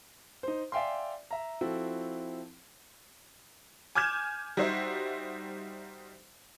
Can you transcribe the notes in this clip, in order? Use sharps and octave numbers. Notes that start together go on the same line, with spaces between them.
D#4 C5
D5 E5 F5 G5 G#5 C6
E5 A#5
F3 C4 E4 F#4 A4
G#5 D6 F6 G6 G#6 E7
G3 D#4 F#4 C5 E5